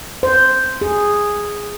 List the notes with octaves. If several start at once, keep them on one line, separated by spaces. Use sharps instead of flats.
C5
G#4